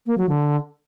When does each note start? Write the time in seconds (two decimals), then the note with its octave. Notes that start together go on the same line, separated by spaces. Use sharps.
0.06 A#3
0.18 F#3
0.29 D3